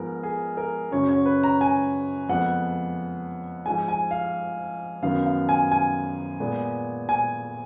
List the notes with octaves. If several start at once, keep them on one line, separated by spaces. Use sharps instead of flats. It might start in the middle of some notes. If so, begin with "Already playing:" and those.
Already playing: G#2 F3 G#3 B3 A#4
G#4
A#4
F#2 C#3 F#3 C#5
C#5
B4
A#5
G#5
F2 F3 G#3 B3 F#5
G#2 F3 G#3 G#5
G#5
F5
F#2 D#3 F#3 B3 F5
F5
G#5
G#5
A#2 G#3 B3
G#5